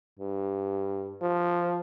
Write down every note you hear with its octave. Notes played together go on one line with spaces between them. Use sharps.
G2
F3